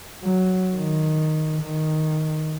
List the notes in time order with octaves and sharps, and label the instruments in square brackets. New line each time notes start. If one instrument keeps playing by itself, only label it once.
[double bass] F#3
D#3
D#3